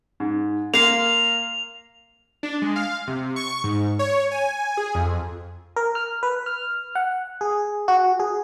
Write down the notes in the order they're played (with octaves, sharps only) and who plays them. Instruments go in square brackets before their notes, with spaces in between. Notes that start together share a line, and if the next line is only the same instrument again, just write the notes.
[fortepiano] G#2
[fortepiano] A#3 [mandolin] F5 C6 [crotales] F7
[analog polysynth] D4
G#3
F5
C3
C#6
G#2
C#5
G#5
G#4
F2
[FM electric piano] A#4
F6
B4
F6
F#5
G#4
F#4
G#4